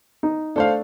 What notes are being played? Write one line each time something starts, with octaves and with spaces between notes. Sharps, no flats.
D#4
A3 D4 A4 C5 F5